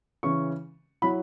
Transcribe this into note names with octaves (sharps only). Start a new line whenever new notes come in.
C#3 E3 C#4 C#6
F#3 E4 B5